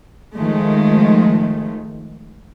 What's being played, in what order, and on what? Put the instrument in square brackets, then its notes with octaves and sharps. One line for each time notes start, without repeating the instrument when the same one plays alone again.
[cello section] D#3 F3 G#3 A3